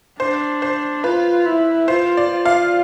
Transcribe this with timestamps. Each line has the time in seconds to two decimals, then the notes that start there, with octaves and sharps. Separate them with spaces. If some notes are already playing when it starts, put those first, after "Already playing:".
0.19 D4 C5
0.62 C5
1.04 F4 B4
1.46 E4
1.88 F4 C5
2.17 D5
2.31 F4
2.46 F5